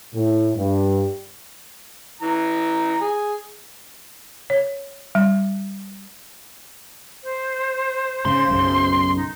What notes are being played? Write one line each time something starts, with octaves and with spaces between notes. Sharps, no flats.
A2
G2
E3 A#5
G#4
C#5
G3
C5
G#2 C#3 C6
B1 F#2 C#3
D#4